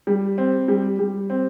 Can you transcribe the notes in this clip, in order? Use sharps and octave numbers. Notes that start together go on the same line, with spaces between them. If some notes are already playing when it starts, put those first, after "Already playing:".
G3
C4
G3
G3
C4